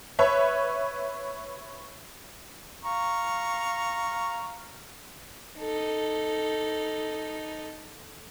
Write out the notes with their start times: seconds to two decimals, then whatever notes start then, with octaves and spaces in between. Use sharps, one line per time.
0.19 B4 C#5 E5
2.84 F5 A#5 C#6
5.60 D#4 A4